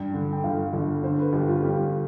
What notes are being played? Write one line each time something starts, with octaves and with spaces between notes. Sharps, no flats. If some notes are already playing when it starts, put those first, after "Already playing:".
Already playing: G2 G5
D3
G5
G1 F5
G1
D3 C5
B4
G1 G4
F4
G2 G4